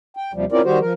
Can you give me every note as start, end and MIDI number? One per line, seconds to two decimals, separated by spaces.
0.17 0.32 79
0.33 0.45 39
0.33 0.45 48
0.33 0.45 53
0.33 0.45 55
0.52 0.61 60
0.52 0.61 61
0.52 0.61 64
0.52 0.61 65
0.52 0.61 70
0.52 0.61 74
0.64 0.79 51
0.64 0.79 55
0.64 0.79 66
0.64 0.79 67
0.64 0.79 72
0.80 0.93 53
0.80 0.93 70